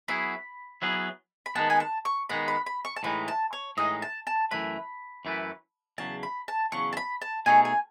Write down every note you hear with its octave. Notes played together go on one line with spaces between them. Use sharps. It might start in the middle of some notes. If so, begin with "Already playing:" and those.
F#3 B3 E4 G#4 B5
F#3 B3 E4 G#4
B5
D#3 G#3 B3 A5
G#5
A5
C#6
D#3 G#3 B3 B5
B5
B5
C#6
A5
A2 E3 G#3 D#4 B5
A5
C#5
A2 E3 G#3 D#4 D#5
A5
A5
F#2 E3 A3 E4 B4 B5
F#2 E3 A3 E4 B4
E2 C#3 F#3 A5
B5
A5
E2 C#3 F#3 C#6
A5
B5
A5
B2 A3 D#4 G#4 C#5 G#5
G#5